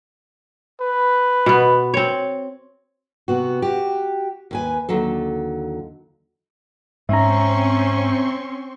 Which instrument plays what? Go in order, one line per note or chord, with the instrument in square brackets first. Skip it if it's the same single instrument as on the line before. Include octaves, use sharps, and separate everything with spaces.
[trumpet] B4
[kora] B2 B3
C4 C#5
[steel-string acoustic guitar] C3 B3 F#4
F#4 G4
D#2 B4 G#5
D#2 D3 F#3 A4
[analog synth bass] G#2 [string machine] C4 C6 C#6 [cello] C#4 [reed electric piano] E5 A#5